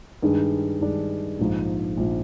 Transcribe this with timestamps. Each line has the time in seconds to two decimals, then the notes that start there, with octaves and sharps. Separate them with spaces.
0.22 G2 D#3 G#3 D4
0.81 G2 D#3 G#3 D4
1.39 A#1 G#2 F3
1.97 A#1 F3